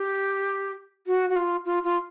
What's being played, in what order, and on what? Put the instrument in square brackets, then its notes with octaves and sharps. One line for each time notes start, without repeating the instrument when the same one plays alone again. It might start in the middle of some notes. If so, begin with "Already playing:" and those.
Already playing: [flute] G4
F#4
F#4
F4
F4
F4